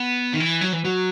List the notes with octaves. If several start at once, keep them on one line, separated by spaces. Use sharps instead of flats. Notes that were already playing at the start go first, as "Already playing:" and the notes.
Already playing: B3
D#3
E3
F#3
E3
F#3